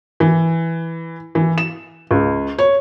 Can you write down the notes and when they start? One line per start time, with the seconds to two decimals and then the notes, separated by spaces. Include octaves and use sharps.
0.20 E3
1.35 E3
1.58 E7
2.11 C#2
2.59 C#5